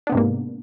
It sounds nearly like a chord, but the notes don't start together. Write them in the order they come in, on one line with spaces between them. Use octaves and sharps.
D4 B3 C3 G#2 A#3